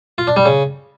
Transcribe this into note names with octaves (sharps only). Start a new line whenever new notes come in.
F4
D4
G3
C#3